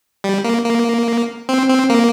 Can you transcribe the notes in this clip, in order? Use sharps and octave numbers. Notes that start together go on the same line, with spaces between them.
G3
A#3
A#3
C4
C4
A#3